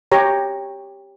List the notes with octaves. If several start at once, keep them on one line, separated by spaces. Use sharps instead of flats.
G4 C#5 A#5